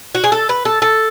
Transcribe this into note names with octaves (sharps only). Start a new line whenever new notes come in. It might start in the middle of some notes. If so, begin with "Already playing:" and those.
F#4
G#4
A4
B4
A4
A4